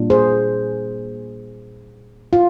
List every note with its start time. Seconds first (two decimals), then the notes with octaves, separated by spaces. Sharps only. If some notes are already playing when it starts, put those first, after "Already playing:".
Already playing: A#2 G3 D4 F4
0.10 G#4 C5
2.33 F4